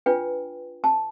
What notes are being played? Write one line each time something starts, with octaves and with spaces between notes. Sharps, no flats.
D4 F4 B4 G5
A5